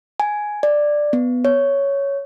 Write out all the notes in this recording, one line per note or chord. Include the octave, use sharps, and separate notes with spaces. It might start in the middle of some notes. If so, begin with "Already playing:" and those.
G#5
D5
B3
C#5